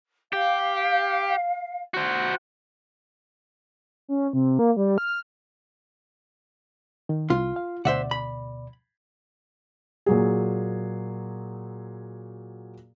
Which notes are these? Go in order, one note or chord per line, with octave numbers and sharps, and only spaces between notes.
G4 F5
F#4 C5
C#4
C3
A#3
G3
F6
D#3
C2 F4
F5
D2 B2 C5 D5 E5 F#5
B5
A#2 F#3 G#4